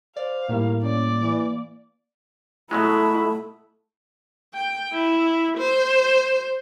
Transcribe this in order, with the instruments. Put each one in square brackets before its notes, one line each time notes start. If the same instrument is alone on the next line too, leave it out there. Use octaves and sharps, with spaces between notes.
[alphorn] C5 [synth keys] D5 [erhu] F5
[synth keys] A2 D#3 G3 [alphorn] A#3
[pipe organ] A#3 [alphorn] C#4 [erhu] D5
[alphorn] E3
[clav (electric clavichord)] B2 F#3 G#3 [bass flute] A3 [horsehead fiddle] E4
[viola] G5
E4
C5